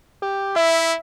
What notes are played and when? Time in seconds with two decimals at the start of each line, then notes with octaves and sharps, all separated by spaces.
0.22 G4
0.56 E4 E5